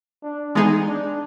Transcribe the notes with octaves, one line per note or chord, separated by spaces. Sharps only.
D4
E3 G#3 B3 D#4 G#4
D4